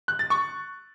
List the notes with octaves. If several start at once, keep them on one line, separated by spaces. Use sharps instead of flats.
F#6
A6
C#6